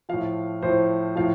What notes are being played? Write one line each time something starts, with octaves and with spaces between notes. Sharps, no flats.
A2 F3 F5
A2 F3 C5
A2 F3 F5